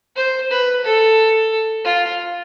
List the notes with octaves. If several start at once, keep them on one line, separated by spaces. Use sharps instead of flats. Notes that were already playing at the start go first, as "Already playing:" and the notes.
C5
B4
A4
F4